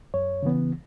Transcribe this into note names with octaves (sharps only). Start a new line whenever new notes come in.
F#2 C#5
C#3 E3 B3